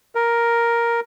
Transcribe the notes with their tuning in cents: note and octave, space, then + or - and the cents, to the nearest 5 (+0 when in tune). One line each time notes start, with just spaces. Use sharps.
A#4 +5